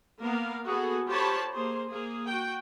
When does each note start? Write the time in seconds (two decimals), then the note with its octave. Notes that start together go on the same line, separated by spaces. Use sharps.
0.21 A#3 B3 A#4 F5
0.67 B3 F#4 G#4 A4
1.09 F4 G4 C5 C#5 A5 B5
1.53 A#3 G#4 C5
1.92 A#3 G#4
2.28 F#4 G5